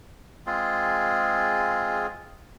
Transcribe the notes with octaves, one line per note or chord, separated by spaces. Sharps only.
G#3 C4 F4 G#4